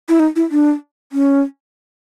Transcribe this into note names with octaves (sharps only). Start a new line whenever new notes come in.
E4
D#4
E4
D4
C#4